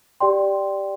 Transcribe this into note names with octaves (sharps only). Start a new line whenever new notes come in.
G4 D5 G5 C6